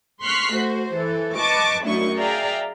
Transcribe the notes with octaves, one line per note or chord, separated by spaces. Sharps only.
C6 C#6 F6 F#6 B6 C7
A3 F#4 C5
E3 A4
B4 D#5 A5 C#6 D6
F#2 A3 D4 E4 D#5 C#6
G#4 D5 E5 F5 G5 A#5